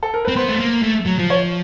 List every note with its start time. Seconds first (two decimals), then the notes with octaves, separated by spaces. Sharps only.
0.03 A4
0.14 A#4
0.25 C4 B4
0.36 B3 C5
0.49 A3
0.60 A#3
0.82 A3
1.06 F#3
1.19 F3
1.30 C#5